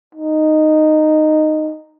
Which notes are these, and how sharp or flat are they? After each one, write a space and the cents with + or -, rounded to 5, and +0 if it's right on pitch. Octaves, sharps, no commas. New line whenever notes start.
D#4 -10